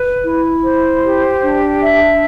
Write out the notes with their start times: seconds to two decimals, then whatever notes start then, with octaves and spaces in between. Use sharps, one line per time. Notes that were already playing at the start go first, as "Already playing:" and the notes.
Already playing: B4
0.23 E4
0.63 C5
1.03 G4
1.42 D4
1.82 E5